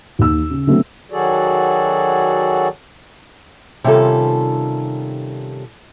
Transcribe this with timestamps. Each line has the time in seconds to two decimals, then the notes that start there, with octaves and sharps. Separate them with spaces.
0.19 D#2 E6
0.50 C#3
0.67 D3 F#3 A3 B3 C4
1.11 D#3 F#3 F#4 G#4 A4 D5
3.84 C3 D#3 G3 C#4 F4 A4